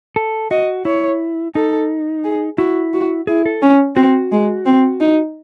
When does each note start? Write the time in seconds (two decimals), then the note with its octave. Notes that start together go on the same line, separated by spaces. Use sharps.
0.16 A4
0.51 F#4 D#5
0.85 E4 C#5
1.55 D#4 A4
2.24 G#4
2.58 E4 F#4
2.94 F#4
3.27 E4 G#4
3.46 A4
3.62 C#4
3.96 C4 F#4
4.32 G#3
4.65 C4
5.01 D#4